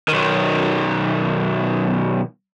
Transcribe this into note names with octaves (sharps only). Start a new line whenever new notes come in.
B1 D#3